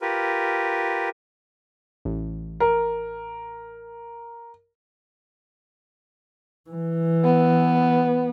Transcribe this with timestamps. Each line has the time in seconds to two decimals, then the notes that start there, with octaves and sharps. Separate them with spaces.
0.01 F4 G4 A#4 B4
2.05 A1
2.60 A#4
6.70 E3
7.24 B3